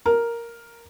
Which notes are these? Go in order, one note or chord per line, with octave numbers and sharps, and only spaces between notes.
A#4